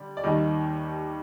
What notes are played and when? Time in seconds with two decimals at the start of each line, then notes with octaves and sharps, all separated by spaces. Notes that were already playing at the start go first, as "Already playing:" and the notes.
Already playing: D3 G3
0.17 D5
0.24 D#2 D#3 G3 D#5